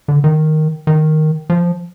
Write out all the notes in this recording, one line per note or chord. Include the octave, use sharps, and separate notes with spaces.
D3
D#3
D#3
F3